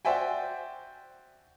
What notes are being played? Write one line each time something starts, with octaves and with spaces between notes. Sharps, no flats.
F#4 C5 D5 E5 G5 G#5